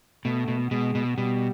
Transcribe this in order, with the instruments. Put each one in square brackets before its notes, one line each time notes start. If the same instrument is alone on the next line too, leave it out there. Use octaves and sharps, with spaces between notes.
[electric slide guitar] B2 [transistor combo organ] A3
[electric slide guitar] B2
[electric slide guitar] B2 [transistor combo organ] G#3
[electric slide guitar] B2
[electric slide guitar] B2 [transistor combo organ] G3